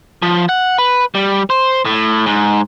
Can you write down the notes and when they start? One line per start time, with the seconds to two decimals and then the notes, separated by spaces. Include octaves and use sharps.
0.22 F3
0.49 F#5
0.78 B4
1.15 G3
1.50 C5
1.85 A2
2.26 G#2